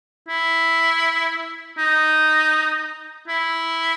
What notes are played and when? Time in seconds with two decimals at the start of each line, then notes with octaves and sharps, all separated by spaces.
0.28 E4
1.78 D#4
3.28 E4